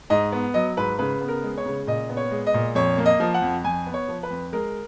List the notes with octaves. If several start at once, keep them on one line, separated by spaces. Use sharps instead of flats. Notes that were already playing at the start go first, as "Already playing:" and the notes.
G#2 D#5
B3
F#3 D#5
G#2 B4
C#3 B4
B3
A#4
G#3
C#5
C#3
A#2 D#5
B3
C#5
G#3
D#5
A#2
F2 C#5
A#3
D#5
F3
F#5
F2
F2 G#5
B3
C#5
F3
B4
F2
G#3 A#4